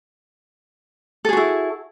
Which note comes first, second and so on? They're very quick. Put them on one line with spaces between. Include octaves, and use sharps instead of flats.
A4 G#4 F#4 E4